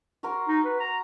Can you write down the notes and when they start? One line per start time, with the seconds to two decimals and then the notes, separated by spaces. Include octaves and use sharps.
0.23 F#4 A#4 C6
0.48 D#4
0.65 B4
0.80 A#5